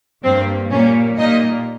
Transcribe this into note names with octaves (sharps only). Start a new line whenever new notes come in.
G2 G3 A#3 C4 C5
A#2 G3 A#3 C#4 C#5
A#2 G3 A#3 D#4 D#5